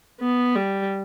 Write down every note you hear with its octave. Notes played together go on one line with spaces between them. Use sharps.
B3
G3